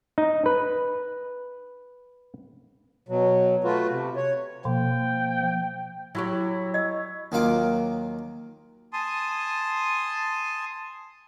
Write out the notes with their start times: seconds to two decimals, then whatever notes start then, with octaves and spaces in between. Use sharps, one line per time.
0.18 D#4
0.46 B4
3.09 B2 F#3
3.64 A3 F4 F#4 B4
3.89 C3
4.16 C#5
4.65 B2 F3 A#3 G5
6.15 F#3 E4 F#4 G4 C#5
6.74 D#5 E6
7.32 D#2 D#3 F#3 F4 D6
8.93 G#5 A5 C6 D#6